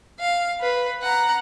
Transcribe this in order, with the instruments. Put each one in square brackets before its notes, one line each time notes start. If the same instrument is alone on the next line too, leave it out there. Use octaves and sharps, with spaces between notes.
[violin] F5
B4
F#5 A#5